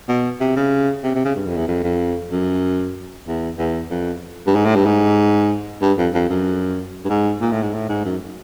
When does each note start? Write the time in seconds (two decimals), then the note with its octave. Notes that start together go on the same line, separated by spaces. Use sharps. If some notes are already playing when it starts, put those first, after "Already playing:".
0.08 B2
0.40 C3
0.56 C#3
1.03 C3
1.15 C3
1.25 C#3
1.36 G2
1.46 F2
1.57 E2
1.68 F2
1.83 F2
2.31 F#2
3.27 E2
3.59 E2
3.90 F2
4.47 G2
4.56 G#2
4.65 A2
4.75 G2
4.86 G#2
5.81 G2
5.98 F2
6.14 F2
6.29 F#2
7.05 G2
7.09 G#2
7.41 A#2
7.52 A2
7.62 G#2
7.73 A2
7.89 G#2
8.05 F#2